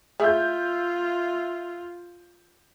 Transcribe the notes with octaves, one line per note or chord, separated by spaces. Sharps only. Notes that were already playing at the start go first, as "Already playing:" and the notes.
A3 E4 F4 G#4 E5 G6